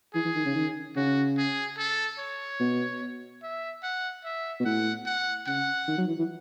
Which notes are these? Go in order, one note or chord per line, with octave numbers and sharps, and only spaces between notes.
E3 G#4
E3
D#3
C#3
D#3
C#3 F#4
G#4
A4
C#5
B2
E5
F#5
E5
B2
A2 F#5
F#5
C#3 F#5
D#3
F#3
E3
E3